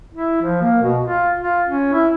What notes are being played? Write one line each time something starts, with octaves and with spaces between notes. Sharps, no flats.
E4
F3
A#3
B2
F4
F4
C#4
E4